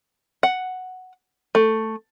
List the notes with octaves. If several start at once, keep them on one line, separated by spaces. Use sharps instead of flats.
F#5
A3